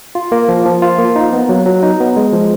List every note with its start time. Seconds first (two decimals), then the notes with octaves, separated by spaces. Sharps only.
0.15 F4
0.32 A#3
0.49 F3
0.66 F3
0.82 F4
0.99 A#3
1.16 D#4
1.33 B3
1.49 F#3
1.66 F#3
1.83 D#4
2.00 B3
2.17 G#3
2.33 F3